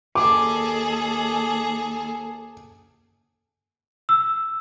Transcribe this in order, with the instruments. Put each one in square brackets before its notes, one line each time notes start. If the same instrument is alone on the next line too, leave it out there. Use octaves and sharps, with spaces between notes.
[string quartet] D#2 G#4 A4 [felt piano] D6
[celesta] E6